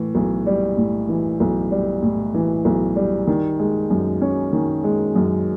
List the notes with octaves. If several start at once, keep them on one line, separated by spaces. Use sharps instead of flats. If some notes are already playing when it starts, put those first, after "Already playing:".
Already playing: A2 E3
B1
G3
A2
E3
B1
G3
A2
E3
B1
G3
D#3
G#3
F#2
C#4
D#3
G#3
F#2